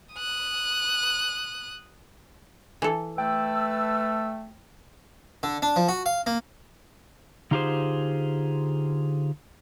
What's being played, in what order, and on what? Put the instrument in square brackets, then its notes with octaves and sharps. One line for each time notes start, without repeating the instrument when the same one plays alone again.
[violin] D#6 F#6
[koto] E3 A4
[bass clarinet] A3 [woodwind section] B4 A5 E6 [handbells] G5
[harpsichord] D3
D4
F3
F#4
F5
A#3
[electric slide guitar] D3 D#4 F4 G4 G#4 C5